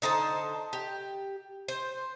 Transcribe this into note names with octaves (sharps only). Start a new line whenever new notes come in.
D3 D#4 C5 A5
G4
C5